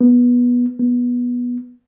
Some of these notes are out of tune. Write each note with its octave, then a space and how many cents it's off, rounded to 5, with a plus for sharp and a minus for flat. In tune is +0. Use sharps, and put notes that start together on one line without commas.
B3 -15
B3 -15